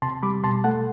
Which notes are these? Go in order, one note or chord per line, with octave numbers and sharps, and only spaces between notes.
C3 A5 C6
G3 B5 D6
B2 A5 C6
A3 F#5 A5